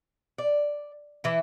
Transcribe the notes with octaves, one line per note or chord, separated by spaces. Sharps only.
D5
E3 E4